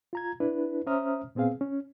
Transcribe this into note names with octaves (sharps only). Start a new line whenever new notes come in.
F4 A#5 G#6
D4 E4 B4
C#4 C5 E5 A#5 D#6 F6
A#2 B3 C4 G#4 F5
C#4